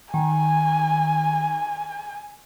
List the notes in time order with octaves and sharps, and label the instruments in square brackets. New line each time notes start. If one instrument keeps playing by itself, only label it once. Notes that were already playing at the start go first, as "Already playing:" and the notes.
[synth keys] D#3 [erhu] G#5